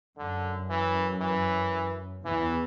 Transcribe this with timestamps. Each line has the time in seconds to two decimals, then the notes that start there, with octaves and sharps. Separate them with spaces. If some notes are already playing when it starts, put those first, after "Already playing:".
0.18 F#2 D3
0.70 E3
1.21 E3
2.25 E2 E3